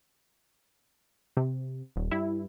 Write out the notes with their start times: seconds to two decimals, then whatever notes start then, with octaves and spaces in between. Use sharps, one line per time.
1.37 C3
1.96 D#1
2.11 G2 E4